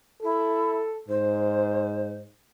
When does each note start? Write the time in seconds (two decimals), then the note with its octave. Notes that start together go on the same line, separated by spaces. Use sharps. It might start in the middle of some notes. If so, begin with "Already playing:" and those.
0.23 E4 A4
1.09 G#2 C5